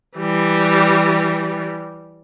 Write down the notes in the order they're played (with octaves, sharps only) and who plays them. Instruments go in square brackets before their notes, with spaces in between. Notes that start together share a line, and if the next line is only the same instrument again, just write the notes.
[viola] E3 G3